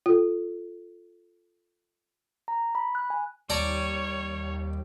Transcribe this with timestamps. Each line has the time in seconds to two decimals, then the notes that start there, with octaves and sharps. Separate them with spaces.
0.06 F4 A4
2.48 A#5
2.75 B5
2.95 F#6
3.10 G#5
3.50 D#2 G3 C#5 D5 A5 A#5